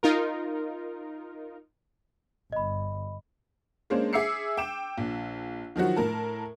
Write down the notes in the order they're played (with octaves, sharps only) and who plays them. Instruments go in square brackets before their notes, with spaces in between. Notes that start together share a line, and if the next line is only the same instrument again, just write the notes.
[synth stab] D#4 F4 A#4
[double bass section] G1 [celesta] D#5 B5
[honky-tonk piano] G#3 A#3 C#4 D4 C5
G#4 E5 D6 E6 C7 C#7
G5 D6 E7
A#1
D#3 F3 F#3 F#4
A2 A#4 A5